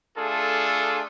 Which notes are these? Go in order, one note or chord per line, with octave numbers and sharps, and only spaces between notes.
A3 D4 F4 G#4 A4